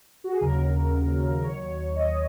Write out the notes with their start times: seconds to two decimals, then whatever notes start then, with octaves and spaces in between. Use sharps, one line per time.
0.24 F#4
0.32 G#4
0.41 D#2 C#3 F#3 A#4
1.44 D#2 D#3 F#3 C#5
1.96 D#5